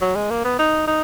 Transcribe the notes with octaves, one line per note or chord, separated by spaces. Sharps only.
F#3
G#3
A#3
B3
D#4
D#4